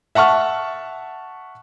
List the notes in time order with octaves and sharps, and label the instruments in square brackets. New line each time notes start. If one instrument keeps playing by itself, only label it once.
[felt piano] E5 F#5 A5 C#6 F6